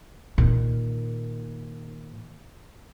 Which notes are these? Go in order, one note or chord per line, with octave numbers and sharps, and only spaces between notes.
A#2 D#3